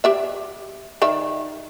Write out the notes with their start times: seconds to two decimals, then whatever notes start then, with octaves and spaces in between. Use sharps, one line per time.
0.04 G4 D5 E5
1.02 D#3 D5 E5